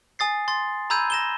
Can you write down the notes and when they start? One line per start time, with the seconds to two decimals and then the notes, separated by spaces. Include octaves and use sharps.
0.19 G#5 D#6 A6 C7
0.48 C6 A6
0.90 A#5 B5 E6 G6 G#6 D#7
1.10 A#6 E7 G7